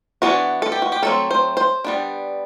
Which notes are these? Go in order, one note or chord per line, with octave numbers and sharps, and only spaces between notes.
E3 B3 D4 F#4
A4
G4
F#4
G4
F#3 A3 C4 A4
C5
C5
G3 B3 D4